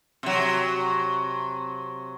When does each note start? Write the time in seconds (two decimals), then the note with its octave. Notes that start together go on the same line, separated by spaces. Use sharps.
0.23 C3 F#3